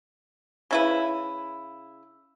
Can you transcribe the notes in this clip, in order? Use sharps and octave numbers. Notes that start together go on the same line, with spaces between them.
C#3 E4 B4